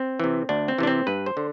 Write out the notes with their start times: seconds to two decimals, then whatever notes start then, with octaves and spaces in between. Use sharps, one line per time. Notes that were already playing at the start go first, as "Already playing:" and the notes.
Already playing: C4
0.20 C3 E3
0.49 D2 D4
0.68 C4
0.78 C3 E3 D4
0.87 C4
1.07 G2 B4
1.26 C5
1.37 D3